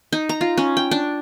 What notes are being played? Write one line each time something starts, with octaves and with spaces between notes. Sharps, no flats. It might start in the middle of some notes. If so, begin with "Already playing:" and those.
D#4
A#5
F4
C#4
G5
D4